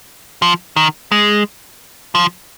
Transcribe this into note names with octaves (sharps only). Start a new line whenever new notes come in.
F3
D#3
G#3
F3